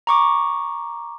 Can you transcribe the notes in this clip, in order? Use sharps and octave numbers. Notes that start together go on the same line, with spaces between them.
A#5 C#6 D6